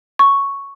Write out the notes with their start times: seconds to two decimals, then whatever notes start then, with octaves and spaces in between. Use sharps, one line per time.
0.19 C#6